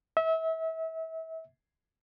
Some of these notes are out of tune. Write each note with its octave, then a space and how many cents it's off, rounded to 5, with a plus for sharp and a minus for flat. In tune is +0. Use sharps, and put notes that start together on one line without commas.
E5 -30